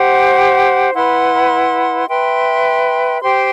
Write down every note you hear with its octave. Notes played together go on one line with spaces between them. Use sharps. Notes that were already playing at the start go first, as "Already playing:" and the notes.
Already playing: G4 C5 F#5
E4 B4 F#5 C6
B4 E5 G5 C6
G4 C5 G5 C6